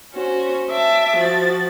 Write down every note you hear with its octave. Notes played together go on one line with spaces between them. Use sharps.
C#4 F#4 C5
E5 A5 D6
F3 F#4 A6